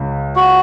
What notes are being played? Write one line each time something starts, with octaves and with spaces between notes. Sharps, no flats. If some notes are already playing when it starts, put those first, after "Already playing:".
Already playing: C#2 C#3
F#4